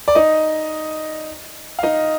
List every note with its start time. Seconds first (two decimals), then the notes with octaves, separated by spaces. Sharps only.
0.08 D5
0.15 D#4 D#5
1.79 F5
1.83 D#4 D#5